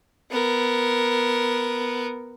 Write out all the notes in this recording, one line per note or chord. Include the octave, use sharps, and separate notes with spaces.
B3 A#4